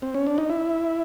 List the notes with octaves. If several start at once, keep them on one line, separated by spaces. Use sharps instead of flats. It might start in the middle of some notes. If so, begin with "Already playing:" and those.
C4
C#4
D4
D#4
E4